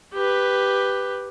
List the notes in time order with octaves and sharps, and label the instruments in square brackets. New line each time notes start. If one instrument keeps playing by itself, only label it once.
[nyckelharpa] G4 B4